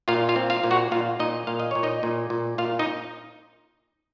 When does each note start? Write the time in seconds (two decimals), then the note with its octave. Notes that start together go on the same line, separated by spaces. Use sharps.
0.08 A#2 F4 F5
0.29 F4 F5
0.36 C4
0.50 F4 F5
0.64 A#2
0.71 F#4 F#5
0.91 A#2 F4 F5
1.19 A#2 D#4 D#5
1.47 A#2 F5
1.60 D#5
1.71 A#2 C#5
1.83 D#4 D#5
2.03 A#2
2.30 A#2
2.58 A#2 F4 F5
2.79 D#4 D#5